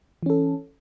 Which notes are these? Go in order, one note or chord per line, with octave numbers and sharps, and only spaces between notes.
E3 C#4 A4